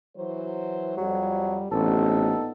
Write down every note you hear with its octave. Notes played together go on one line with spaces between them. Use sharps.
E3 F#3 C5
F2 F#3 G3
A1 A#2 B3 C4 D#4 A4